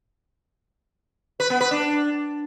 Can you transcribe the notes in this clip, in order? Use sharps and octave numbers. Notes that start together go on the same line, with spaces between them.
B4
B3
B4
D4